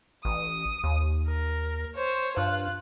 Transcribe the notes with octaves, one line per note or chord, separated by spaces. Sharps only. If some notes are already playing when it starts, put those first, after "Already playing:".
A1 D#6
D#2
A#4
C5 C#5
G2 F4 F#6